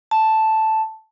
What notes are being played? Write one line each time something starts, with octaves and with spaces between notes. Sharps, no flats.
A5